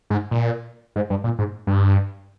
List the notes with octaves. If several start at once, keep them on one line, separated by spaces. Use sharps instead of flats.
G#2
A#2
G#2
G2
A#2
G#2
G2